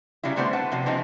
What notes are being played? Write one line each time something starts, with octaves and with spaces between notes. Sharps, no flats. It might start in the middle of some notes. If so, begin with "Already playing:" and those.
C#3 F#3 G3 E4
D3 G3 A3 B3 C4 C5
B4 F#5 A5
C3 F3 F#3
C#3 F3 B3 C4 D#4